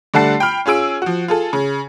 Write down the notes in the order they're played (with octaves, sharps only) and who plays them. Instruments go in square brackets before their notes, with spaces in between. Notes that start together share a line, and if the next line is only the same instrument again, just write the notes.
[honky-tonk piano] D3 G3 A3 F#5 A5 C7
G5 B5 F6
C#4 F4 G#4 E6 D7
F3 F#4
F4 G#4 A4
C#3